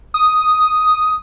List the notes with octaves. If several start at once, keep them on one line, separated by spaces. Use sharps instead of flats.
D#6